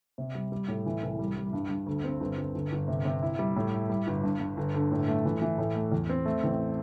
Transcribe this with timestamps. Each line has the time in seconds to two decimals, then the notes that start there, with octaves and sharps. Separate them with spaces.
0.18 C3
0.35 G3
0.52 G3
0.68 A2
0.86 E3
1.03 C2
1.19 G3
1.37 G3
1.53 G2
1.70 G2
1.86 D2
2.04 C4
2.20 G1
2.37 G1
2.55 G1
2.72 G1
2.88 C3
3.05 C3
3.23 E4
3.39 G3
3.56 A2
3.73 E4
3.90 G3
4.07 G1
4.24 G2
4.40 G2
4.57 G1
4.74 D3
4.91 A2
5.08 A3
5.25 E3
5.42 E3
5.58 A2
5.75 A3
5.92 E2
6.09 C4
6.26 A3
6.43 A1